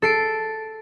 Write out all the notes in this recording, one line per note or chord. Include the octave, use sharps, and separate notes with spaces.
A4 C7 D7